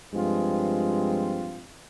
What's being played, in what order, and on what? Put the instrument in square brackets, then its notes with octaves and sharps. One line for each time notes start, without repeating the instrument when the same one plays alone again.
[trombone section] G2 F3 G#3 C4 F4